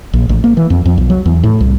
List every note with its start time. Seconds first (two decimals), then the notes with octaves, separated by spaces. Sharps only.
0.13 A#1
0.29 A1
0.44 A#3
0.57 E3
0.70 F2
0.86 F2
0.98 B1
1.10 F#3
1.26 E2
1.43 A2
1.61 C2